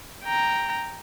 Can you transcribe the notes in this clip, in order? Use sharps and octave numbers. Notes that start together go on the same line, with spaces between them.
G5 A#5